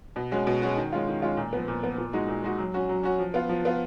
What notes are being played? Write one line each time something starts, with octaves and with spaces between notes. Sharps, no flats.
B2
G#3 C#4 F#4
B2
G#3 C#4 F#4
D#3
G#3 C#4 F4
D#3
G#3 C#4 F4
A#2
F3 B3
A#2
F3 B3
A#2
G#3 D#4 F#4
A#2
G#3 D#4 F#4
F#3
C#4 F#4
F#3
C#4 F#4
F3
B3 F4
F3
B3 F4